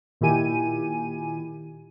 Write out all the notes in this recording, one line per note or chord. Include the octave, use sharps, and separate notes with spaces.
A#2 D#3 E4 G4 G#5 D#7